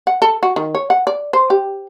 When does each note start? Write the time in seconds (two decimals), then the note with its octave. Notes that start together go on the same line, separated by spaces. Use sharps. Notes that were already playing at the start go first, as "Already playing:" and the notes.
0.07 F#5
0.22 A4
0.43 F#4
0.56 D#3
0.75 C#5
0.90 F#5
1.07 D5
1.33 C5
1.50 G4